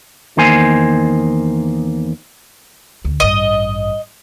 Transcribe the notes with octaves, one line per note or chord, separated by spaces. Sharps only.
E2 D#3 A#3 C5 G#5
D2
A1 G2 D#5